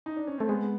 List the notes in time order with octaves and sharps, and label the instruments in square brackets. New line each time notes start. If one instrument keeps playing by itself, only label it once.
[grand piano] D#4
D4
C#4
[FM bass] A3 [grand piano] C4
[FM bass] G#3 [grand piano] B3